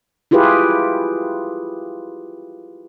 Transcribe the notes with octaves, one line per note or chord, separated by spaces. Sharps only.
E4 F4 G4 G#4 B4